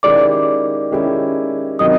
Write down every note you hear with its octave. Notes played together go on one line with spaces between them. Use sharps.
D#3 G#3 C#4 E4 G4 D5 D6
D#3 G#3 C#4 E4 G4
C3 D#3 F#3 D#5 D#6